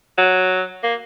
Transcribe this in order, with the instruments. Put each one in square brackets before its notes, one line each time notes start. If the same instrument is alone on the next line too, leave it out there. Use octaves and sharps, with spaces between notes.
[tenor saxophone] F#3
A#3